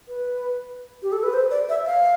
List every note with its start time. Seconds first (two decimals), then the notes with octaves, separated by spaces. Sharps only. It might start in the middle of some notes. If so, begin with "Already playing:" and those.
0.08 B4
1.03 G4
1.12 A4
1.23 B4
1.33 C5
1.51 D5
1.69 E5
1.86 F5